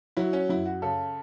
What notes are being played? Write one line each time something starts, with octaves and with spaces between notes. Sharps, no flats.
F#3 E4
C#4
F#2 E4
F#4
C#3 A4